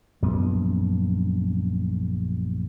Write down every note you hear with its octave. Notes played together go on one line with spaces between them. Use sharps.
A#1 F#2 B3